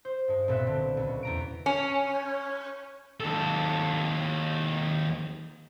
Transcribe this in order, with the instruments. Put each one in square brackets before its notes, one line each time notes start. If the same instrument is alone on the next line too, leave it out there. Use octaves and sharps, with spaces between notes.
[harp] C5
G2 G#3
B1 A#2 C4 E5 F#6
D3
C#2
E2 A#5 D7
[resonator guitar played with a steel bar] C#4
[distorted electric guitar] D#2 A4